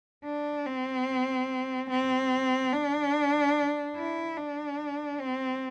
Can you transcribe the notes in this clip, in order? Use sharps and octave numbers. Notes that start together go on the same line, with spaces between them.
D4
C4
C4
D4
E4
D4
C4